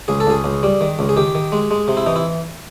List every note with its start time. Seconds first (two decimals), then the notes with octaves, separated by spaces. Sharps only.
0.08 C#2 G#4
0.20 A4
0.27 C#2 G#4
0.44 C#2
0.63 G3
0.81 D#3
0.99 C#2
1.09 G#4
1.17 D#3 G4
1.35 D#3
1.52 G#3
1.71 G#3
1.88 C3
1.97 E4
2.06 E3 D#4
2.16 E4